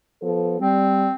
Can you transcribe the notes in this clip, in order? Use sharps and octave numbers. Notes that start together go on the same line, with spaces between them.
F3 B3 A4
G3 C4